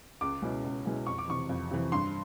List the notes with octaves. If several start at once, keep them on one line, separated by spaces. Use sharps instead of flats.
C#2 D6
B2 G#3 C#4 E4
C#2
B2 G#3 C#4 E4
F2 C#6
D6
C3 E3 C#6
F2
C3 E3
G2 C6